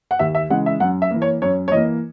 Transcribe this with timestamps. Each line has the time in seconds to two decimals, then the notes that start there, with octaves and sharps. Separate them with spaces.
0.11 F#5
0.19 D#2 E5
0.35 E5
0.50 C#3 E3 G#3 F#5
0.66 E5
0.80 F#2 F#5
1.02 E5
1.11 E3 A#3
1.22 C#5
1.42 F#2 C#5
1.68 C#5
1.72 E3 A#3 D#5